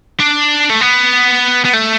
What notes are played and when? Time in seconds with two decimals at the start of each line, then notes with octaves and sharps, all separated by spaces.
0.20 D4
0.70 A3
0.81 B3
1.65 B3
1.73 A3